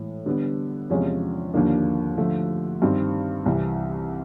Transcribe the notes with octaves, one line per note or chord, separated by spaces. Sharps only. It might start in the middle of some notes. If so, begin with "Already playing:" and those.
Already playing: A2 E3 G#3
D3 G3 B3 D4
E2 C3 F3 G#3 C#4
D#2 D3 F3 A#3 D4
D3 F3 A3
G2 D#3 G3 C4
C2 C3 E3